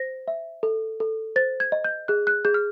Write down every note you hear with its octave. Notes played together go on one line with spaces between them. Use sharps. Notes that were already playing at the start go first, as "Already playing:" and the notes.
Already playing: C5 A#6
E5
A4
A4
C5 A6
G#6
D#5
G6
G#4 F#6
F#6
G#4 G6
F6